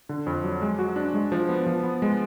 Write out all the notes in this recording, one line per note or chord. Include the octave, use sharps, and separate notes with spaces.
D3
F2
F#3
G#3
F#4
D4
G#3
F3
B3
F3
B3
G#3